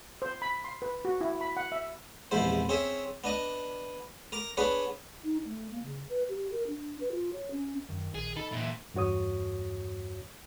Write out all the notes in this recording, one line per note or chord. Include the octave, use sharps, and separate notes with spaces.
C5
B5
C6
B4
F#4
E4
B5
F#5
E5
A#1 E2 G#2 C3 E4 C5
C4 C#4 G#4 C#5 E5
B3 D4 D#5
A#4 A#5 D6
B3 D4 G#4 B4 C#5
D#4
A3
A#3
C#3
B4
G4
A#4
D4
B4
F4
C#5
C#4
F#2 D#3
A#1 G#4
D#4 A4 B5
A#2 E3 E5
E2 G2 F#4 C#5 D#6